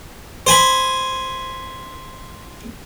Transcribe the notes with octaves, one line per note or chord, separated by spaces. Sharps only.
C5 G#5 B5